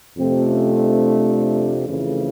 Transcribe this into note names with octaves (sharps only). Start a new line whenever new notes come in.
F2 C3 F3 A3 C4
C#4
D4
F2 C#3 E3 A3